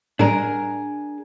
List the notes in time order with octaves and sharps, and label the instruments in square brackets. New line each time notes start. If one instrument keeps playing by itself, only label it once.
[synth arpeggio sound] A2 G3 [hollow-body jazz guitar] D4 G#4 A#4